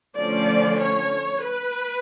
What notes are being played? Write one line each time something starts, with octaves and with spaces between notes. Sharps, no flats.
D3 F3 A3 C#4 D5
C#5
B4